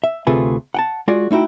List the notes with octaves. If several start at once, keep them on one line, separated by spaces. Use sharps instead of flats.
E5
D2 C3 A3 F4 G#4 B4
F#5 G5 A5
G#3 F4 F#4 G#4 D5
A3 D#4 E4 F#4 G5